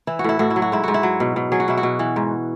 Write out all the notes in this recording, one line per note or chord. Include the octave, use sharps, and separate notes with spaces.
E3 E4
F#4
A2 E4
A2 F#4
E4
F#3
F#4
G#2 E4
G#2 F#4
E4
F#3
B2
B2
F#3 G#4
F#4
B2 E4
F#4
B2
E3
G#2